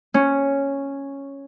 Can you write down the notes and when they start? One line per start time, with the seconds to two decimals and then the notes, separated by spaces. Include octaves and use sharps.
0.14 C#4